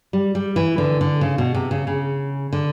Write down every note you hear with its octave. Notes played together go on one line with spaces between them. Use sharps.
G3
G3
E3
D3
D3
C#3
B2
C3
C#3
C#3
D3